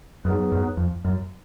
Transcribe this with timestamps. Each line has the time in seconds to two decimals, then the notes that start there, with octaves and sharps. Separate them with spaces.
0.25 F#2 F#3 B3 D#4 G#4 B4
0.52 F#2
0.77 F2
1.05 F#2